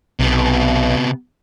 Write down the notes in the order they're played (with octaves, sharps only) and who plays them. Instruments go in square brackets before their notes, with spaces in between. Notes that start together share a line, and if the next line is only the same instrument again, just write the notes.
[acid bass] B1 [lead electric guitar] C3 B3